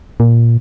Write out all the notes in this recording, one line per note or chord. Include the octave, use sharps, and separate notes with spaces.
A#2